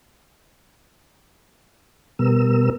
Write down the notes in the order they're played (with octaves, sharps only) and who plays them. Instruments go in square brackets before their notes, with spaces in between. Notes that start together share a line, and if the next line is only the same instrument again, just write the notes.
[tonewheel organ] B2 G3 B3 A#4 E6